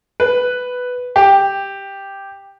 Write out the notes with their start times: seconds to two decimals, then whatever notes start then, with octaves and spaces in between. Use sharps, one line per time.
0.20 B4
1.16 G4